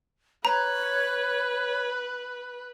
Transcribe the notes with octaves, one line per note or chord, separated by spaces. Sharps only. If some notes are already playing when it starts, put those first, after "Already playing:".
B4 C#5 A#5